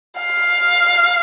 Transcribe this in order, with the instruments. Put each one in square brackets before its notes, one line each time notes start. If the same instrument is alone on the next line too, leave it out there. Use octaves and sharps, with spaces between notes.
[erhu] F5